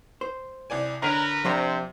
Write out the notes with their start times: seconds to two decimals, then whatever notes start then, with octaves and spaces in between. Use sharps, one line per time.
0.21 C5
0.70 C2 D5 G#5
1.02 D3 A#4 B4 C#5 D#5 A#5
1.45 C3 F3 D4 C5